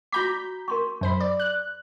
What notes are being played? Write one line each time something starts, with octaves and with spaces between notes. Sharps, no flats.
F#4 A#5 B5 D6 G6 B6
A#4 C6 C#6
F#2 C5 B5
D5
F#6